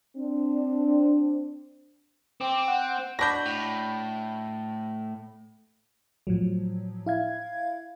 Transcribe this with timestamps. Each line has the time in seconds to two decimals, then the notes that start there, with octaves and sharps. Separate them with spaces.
0.17 C4 D4
2.40 C4 D6
2.68 F#5
3.19 D4 F#4 B5 G6 A#6
3.46 A2
6.27 A2 F3 F#3
7.06 E4 F5 G#6